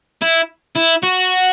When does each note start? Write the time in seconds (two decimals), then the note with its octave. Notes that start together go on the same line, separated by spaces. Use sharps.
0.22 E4
0.76 E4
1.03 F#4